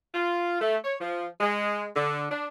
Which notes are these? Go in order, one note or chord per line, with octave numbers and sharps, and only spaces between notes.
F4
A3
C#5
F3
G#3
D3
D4